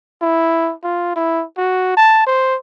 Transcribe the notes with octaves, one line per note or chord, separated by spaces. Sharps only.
E4
F4
E4
F#4
A5
C5